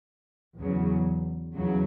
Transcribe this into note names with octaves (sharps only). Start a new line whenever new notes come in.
E2 C#3 F#3
E2 C#3 F#3